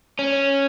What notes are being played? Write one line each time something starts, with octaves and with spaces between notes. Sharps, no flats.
C#4